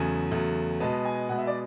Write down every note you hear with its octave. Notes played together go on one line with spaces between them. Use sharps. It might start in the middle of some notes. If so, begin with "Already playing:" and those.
Already playing: E2 C#3 F#3 A3 G#5
E2 C#3 F#3 A3
B2 G#3 B3 A5
G#5
B2 G#3 B3 F#5
E5
D5